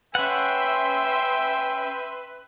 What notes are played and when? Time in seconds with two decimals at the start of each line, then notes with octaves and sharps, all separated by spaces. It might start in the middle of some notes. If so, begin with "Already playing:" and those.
0.15 C#4 B4 E5 F#5 G5 C6